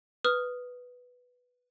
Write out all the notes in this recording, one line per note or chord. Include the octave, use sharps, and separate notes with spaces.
B4 D#6 F6